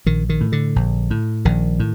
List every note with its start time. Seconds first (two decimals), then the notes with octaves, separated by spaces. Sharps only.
0.06 A#1 D#3
0.29 D#3
0.41 A2
0.52 D3
0.76 A#1
1.11 A2
1.45 A#1 D#3
1.80 A2